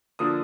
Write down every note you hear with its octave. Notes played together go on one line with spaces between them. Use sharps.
D3 F3 A#3 D4 D#6